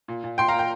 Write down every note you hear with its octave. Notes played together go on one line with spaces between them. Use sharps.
A#2
A#2
A#2 G5 C6
F5 A#5
A#2
G5